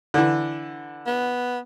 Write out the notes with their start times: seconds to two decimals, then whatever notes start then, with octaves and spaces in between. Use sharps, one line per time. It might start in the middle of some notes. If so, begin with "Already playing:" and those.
0.14 D3 E3
1.07 B3